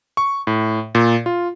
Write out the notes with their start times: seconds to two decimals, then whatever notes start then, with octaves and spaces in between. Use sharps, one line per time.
0.17 C#6
0.47 A2
0.95 A#2
1.26 F4